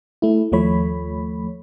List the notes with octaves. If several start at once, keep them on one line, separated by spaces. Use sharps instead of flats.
A3 E4
D#2 F3 A3 C#5 B5